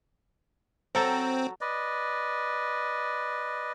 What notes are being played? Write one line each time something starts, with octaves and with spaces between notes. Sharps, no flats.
F#3 C4 A4 A#5
B4 D5 D#5